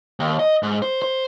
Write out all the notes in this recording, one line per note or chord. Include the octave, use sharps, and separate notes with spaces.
D#2
D#5
G#2
C5
C5